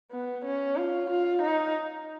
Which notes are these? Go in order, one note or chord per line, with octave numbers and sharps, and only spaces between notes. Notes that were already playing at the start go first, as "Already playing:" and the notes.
B3
C#4
F4
F4
D#4